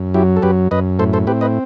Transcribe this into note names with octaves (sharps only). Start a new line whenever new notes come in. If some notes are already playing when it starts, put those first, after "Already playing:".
Already playing: F#2
F#3 E4 G4
A4
F#2 G4 B4
F#2 B4 D#5
A2 A4 C5
A4 C5
C4 G4 B4
B4 D#5